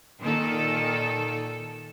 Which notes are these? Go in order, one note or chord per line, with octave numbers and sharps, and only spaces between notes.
A#2 D#3 A4